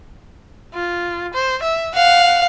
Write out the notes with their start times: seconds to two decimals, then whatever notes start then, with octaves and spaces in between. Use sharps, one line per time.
0.74 F4
1.34 C5
1.63 E5
1.95 F5 F#5